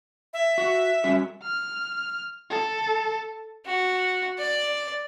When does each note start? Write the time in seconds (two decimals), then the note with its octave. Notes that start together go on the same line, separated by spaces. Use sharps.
0.33 E5
0.58 F#4 F#5
1.04 G3 C#4 F#4
1.43 F6
2.50 A4
3.66 F#4
4.38 D5